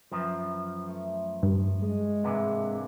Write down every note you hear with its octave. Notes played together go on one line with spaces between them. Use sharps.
F#2 E3 F3
A3
G2
G#3 D#5
G#2 C3 E3 A#3 D4